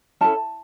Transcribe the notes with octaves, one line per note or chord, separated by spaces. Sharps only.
C#4 E4 A4 A5